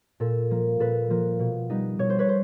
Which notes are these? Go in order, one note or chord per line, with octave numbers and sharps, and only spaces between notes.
A#2 A4
F3 A#3
A#2 A4 B4
F3 A#3
B2
G3 B3 D#4
B2 C#5
C5
B4 C#5
C5